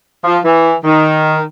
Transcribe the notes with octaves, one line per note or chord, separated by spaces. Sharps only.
F3
E3
D#3